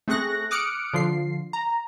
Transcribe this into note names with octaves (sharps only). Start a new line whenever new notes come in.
A3 C4 G#4 C#6 F#6 A#6
D6 D#6 F6 F#6 C#7 D7
D3 F3 F4 C7
A#5